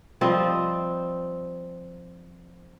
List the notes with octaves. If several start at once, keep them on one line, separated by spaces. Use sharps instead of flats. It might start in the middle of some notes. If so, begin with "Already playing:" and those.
F3 G3 C4 D#5